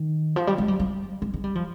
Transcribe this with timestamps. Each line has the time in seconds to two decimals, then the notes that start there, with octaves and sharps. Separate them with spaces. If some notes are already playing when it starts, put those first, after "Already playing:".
Already playing: D#3
0.36 F3
0.47 G3
0.58 G#3
0.68 G3
0.80 G3
1.22 G#3
1.34 G#3
1.44 G3
1.55 F3